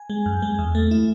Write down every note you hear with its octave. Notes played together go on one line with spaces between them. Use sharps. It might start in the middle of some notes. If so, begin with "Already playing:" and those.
Already playing: G#5
G#3
F#2
G#3
E2
A3
E4